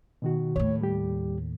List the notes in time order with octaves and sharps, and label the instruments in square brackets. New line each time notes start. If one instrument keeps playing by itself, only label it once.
[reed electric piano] B2 D#3 F#4
[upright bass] D#2 A2 [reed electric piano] C#5
[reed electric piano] G3 G4